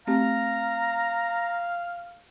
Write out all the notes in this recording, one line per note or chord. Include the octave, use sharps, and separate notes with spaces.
A3 C4 G4 F5 A#5